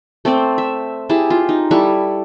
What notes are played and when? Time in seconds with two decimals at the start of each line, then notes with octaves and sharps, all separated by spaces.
0.25 A3 C4 C5 D5
0.58 E5
1.09 E4 G4 G#4 A5
1.30 F4
1.49 D#4
1.71 G3 E4 A4 C#6